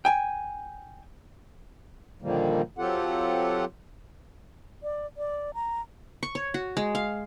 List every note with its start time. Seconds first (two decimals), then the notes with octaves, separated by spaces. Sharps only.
0.05 G5 G#5
2.22 A#2 D3 D#3 F3 G3 A#3
2.78 F#3 C4 F4 G4 A4 F#5
4.83 D5
5.17 D5
5.54 A#5
6.23 C#6
6.35 C#5
6.54 F#4
6.77 G#3
6.95 F5